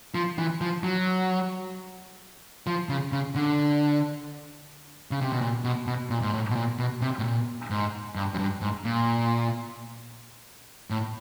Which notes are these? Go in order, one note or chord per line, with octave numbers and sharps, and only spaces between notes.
F3
E3
F3
F#3
F3
C#3
C#3
D3
C#3
C3
B2
A#2
B2
B2
A#2
G#2
A2
B2
A#2
B2
C3
A2
A#2
G#2
G2
F#2
G2
G#2
A#2
A2